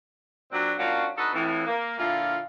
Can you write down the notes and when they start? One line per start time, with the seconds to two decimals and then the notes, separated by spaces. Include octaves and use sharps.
0.51 A#2 F#3 C4 D4
0.78 F3 A#3 C#4 D4 F4 F#4
1.18 D4 D#4 F#4 A4 B4
1.33 F2 A2 E3
1.66 A#3
1.99 A#2 D3 E4 F4